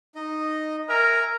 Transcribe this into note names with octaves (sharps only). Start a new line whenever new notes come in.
D#4 D#5
A#4 E5 G#5 A#5